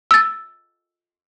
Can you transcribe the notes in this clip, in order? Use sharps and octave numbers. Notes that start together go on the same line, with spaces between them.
E6 A6